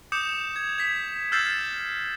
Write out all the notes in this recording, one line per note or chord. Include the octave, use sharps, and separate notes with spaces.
D6 D#6 G6 C#7 E7
G#6
G#6 B6
E6 F6 G6 A6 C7 E7